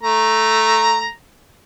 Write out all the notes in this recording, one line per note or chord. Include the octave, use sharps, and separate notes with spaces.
A3 A#5